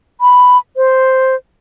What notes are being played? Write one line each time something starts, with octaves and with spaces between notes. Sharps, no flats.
B5
C5